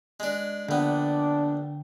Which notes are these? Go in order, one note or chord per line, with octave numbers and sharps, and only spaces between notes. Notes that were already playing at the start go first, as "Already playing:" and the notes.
G#3 D4
A#1 D3 B3 D4 G5